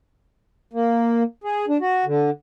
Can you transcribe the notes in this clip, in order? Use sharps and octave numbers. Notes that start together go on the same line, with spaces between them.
A#3
G#4
D4
F#4
D3